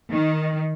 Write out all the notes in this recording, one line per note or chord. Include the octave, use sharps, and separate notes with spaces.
D#3